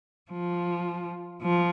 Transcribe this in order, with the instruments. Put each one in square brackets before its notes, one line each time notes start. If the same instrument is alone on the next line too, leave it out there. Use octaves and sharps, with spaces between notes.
[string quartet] F3
F3